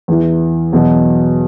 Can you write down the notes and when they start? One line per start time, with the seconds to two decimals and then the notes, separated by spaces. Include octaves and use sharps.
0.08 E2 E3
0.73 E2 B2 F#3